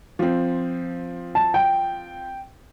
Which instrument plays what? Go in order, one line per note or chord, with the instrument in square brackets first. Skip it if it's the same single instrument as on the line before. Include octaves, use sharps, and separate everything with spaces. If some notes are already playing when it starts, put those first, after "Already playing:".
[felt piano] F3 C4
[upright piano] A5
G5